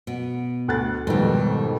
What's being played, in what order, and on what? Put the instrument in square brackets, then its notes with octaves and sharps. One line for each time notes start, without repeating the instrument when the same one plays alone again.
[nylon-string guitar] B2
[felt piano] D2 F#6 A6
[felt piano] F2 G#2 B2 [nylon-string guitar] D#3 G3